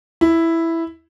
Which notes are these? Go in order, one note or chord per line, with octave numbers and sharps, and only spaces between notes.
E4